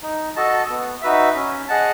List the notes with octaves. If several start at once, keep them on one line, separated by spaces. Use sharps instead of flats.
D#4
F#4 A4 D#5 A5
B3
D#4 F#4 B4 E5
C#4
G#4 D#5 F#5 A5